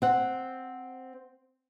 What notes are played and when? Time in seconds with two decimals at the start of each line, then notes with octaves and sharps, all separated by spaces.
0.02 C4 F#5